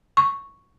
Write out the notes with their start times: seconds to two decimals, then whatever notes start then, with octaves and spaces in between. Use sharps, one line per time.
0.17 C#6